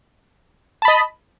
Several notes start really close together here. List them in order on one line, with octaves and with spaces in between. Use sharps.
A5 B5 D#5